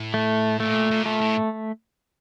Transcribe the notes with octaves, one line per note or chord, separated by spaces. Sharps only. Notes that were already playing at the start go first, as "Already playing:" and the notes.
Already playing: A2
A3
A#2 A3
A#2
A3
A2